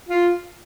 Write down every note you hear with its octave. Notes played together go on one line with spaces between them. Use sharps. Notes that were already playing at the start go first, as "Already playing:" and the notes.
F4